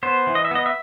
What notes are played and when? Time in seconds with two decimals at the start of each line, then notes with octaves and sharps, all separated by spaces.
0.03 B3 C5
0.27 E3
0.35 D#5
0.45 E5
0.51 B3 D#5
0.66 E5